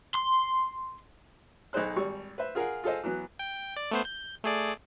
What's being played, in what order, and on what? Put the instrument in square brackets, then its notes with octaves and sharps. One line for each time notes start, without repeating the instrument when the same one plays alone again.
[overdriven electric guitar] C6
[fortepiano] B1 D#4 G#4 C5 F#6
G#1 G3 C#6
B4 C5 E5
F4 G#4 A#4 F5 F#5
F4 G#4 A4 C5 D#5
E3 F#3 B3
[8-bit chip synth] G5
D5
A3 B3 C5
G6
A3 G#4 D5